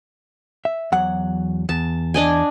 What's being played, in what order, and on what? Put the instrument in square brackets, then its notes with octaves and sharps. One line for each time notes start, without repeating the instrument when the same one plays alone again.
[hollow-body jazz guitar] E5
E2 F#3 F#5
[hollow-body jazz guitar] E2 [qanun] A5
[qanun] D4 D#5 G#5